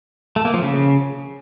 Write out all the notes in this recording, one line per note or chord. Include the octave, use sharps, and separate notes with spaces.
A3
A#3
F3
C#3